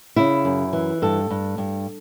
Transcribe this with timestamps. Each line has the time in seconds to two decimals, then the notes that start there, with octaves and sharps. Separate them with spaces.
0.16 C#3 E4
0.45 F#2
0.73 E3
1.02 G2 A4
1.30 G2
1.58 G2